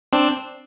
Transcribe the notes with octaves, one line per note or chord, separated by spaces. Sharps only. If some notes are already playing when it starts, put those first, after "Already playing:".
C4 D4